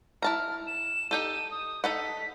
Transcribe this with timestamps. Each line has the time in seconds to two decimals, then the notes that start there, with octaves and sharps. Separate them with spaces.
0.22 E4 A5 A#5 F6
0.67 E7
1.11 D#4 G4 A4 D#7
1.51 D#6
1.84 D#4 A4 F#5 B6